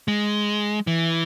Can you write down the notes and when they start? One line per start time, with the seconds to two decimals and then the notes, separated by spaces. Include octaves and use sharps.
0.08 G#3
0.87 E3